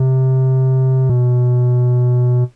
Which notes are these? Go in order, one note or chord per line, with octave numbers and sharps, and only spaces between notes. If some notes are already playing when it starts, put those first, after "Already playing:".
Already playing: C3
B2